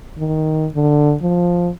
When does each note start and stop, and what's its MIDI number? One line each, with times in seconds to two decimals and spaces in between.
0.18 0.67 51
0.73 1.14 50
1.22 1.69 53